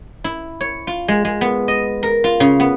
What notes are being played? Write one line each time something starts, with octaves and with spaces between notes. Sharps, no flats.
E4
C#5
F4
G#3
G#3
B3
D#5
A#4
F4
C#3
B3